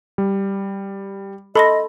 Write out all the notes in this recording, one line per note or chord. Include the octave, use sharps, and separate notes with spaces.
G3
A4 D#5 B5 C6 A#6